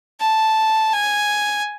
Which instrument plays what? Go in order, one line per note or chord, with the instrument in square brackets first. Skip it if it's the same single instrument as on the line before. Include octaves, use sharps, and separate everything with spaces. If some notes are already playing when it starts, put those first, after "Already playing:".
[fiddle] A5
G#5